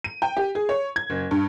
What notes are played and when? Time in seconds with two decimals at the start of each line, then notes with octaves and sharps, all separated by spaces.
0.04 D#7
0.22 G5
0.37 G4
0.55 G#4
0.69 C#5
0.96 G#6
1.10 F#1
1.31 G2